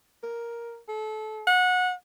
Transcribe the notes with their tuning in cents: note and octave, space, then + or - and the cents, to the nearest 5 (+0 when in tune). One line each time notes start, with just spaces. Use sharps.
A#4 +5
A4 -25
F#5 -20